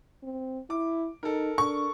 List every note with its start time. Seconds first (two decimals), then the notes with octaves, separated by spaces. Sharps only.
0.23 C4
0.70 E4 D6
1.23 D#4 A4 A#4
1.58 D4 C#6